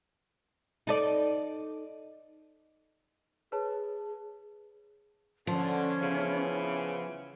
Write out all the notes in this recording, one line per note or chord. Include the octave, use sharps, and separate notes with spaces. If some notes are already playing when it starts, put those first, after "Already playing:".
D#4 A4 D5
G#4 B4 C#5 A5
D3 F3 C#4
C#3 E3 B3